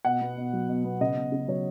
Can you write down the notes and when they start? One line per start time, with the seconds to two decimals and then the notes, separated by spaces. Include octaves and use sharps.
0.05 B2 F#5
0.21 B3
0.37 B2
0.53 F#3
0.69 B2
0.84 B3
1.01 C#3 D#5
1.16 B3
1.32 C#3
1.48 F#3 C#5